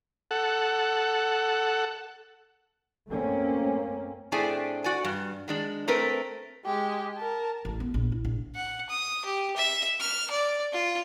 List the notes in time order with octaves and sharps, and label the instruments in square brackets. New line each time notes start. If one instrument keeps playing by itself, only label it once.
[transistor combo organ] A4 F#5
[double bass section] F#2 A3 A#3 C4 C#4
[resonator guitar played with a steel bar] A2 A3 C4 D4 G#4 G#5
F#4 D5 G#5
G2
D#3 G#3 D4
A3 C4 A#4 B4
[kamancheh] G#3 G4
A#4 A5
[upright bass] A1
B3
A#1
E4
A#1
[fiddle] F#5
D#6
G4
E5
F6
D5
F4